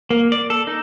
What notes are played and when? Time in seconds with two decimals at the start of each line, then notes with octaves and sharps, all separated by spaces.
0.10 A#3
0.32 D5
0.50 A4
0.67 D#4